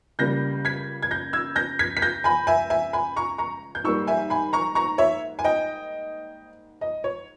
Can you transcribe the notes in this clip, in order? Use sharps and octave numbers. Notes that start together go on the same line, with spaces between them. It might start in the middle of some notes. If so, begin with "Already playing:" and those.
C#2 C#3 G3 A#3 G6 A#6
G#6 B6
G#6
G6 A#6
E6 G#6
G6 A#6
G#6 B6
B6
G6 A#6
G#5 B5
E5 G#5
E5 G#5
G#5 B5
A#5 C#6
A#5 C#6
G6
G#2 G3 A#3 C#6 E6
E5 G#5
G#5 B5
A#5 C#6
A#5 C#6
C#5 E5
G#5
D#5 G5
D#5
C#5